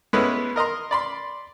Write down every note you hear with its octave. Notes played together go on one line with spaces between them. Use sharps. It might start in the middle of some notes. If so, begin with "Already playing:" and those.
G#3 A3 B3 C#4 E4 B4
A#4 D#5 A#5 C6
D5 B5 C6